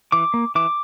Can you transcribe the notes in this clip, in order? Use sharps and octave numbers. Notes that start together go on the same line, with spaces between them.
E3 D6
A#3
E3 D6